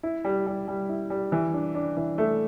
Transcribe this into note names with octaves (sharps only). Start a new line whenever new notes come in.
E4
G3
G3
G3
E4
G3
E3
D4
D4
E3
A3